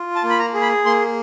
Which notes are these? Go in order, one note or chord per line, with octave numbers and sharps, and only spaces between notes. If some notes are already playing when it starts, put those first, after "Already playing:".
Already playing: F4
A5
A#3
B5
A#5
G#4
B5
A#3 C6